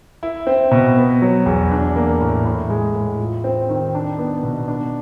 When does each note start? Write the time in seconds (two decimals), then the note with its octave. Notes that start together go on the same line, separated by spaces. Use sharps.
0.23 E4
0.47 C4
0.71 B2
0.97 B3
1.22 F#3
1.46 E2
1.71 D4
1.96 A#3
2.21 A2
2.46 A2
2.70 G#3
2.95 A2
3.20 F4
3.44 C4
3.69 D#3
3.95 D4
4.18 B3
4.43 B2
4.68 D4